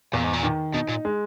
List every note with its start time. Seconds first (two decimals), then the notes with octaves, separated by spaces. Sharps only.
0.13 E2 A#2
0.24 G#2
0.33 A#2
0.43 D#3
0.74 B2 D#4
0.89 A#2
1.05 G#3